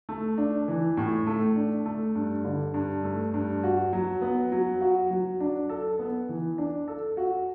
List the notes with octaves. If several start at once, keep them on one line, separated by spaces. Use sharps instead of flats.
A3
D4
E3
A2
A3
D4
A3
G2
D3
G2
A3
G2
F#4
F#3
B3
F#3
F#4
F#3
D4
A4
B3
E3
D4
A4
F#4